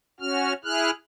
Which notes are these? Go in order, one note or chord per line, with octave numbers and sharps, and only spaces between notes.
C#4 F#4 F6
E4 G#4 F6 F#6